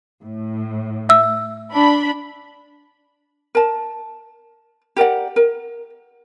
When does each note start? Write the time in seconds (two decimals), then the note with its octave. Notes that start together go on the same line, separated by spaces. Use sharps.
0.23 A2
1.09 E5 E6
1.72 D4 B5
3.55 A#4 A5
4.96 G4 A#4 D5 F#5
5.36 A#4